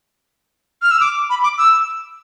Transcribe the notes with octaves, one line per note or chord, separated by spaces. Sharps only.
F6
E6
D6
B5
D6
E6